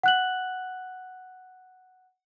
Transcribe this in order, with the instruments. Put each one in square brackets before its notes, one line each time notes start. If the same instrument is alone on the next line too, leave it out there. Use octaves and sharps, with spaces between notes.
[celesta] F#5 F#6 F#7